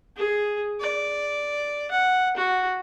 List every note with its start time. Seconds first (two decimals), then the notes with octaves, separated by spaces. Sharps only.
0.17 G#4
0.80 D5
1.91 F#5
2.37 F#4